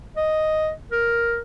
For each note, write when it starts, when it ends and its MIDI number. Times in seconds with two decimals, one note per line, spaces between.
0.17 0.71 75
0.92 1.41 70